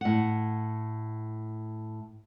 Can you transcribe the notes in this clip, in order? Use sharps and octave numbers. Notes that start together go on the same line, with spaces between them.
A2 F#5